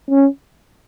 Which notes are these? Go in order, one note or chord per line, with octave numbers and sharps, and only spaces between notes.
C#4